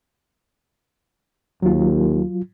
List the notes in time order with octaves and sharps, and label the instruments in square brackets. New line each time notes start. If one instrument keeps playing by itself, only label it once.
[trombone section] D#2 [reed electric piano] F#3 F4